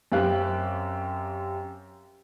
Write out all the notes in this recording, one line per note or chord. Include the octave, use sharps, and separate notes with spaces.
F#2 C4 G4 F5 G5 F#6